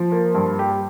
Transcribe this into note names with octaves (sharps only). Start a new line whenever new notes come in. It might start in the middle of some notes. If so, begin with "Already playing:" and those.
Already playing: F3
A#3
G2
G4